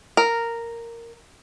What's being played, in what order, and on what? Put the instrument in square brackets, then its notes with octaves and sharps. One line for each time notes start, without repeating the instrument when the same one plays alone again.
[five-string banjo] A#4